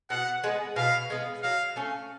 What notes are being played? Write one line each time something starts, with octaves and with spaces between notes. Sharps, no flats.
B2 F#5
G#3 B3
B2 F5
G#3 B3
F#3 F5
A3 C#4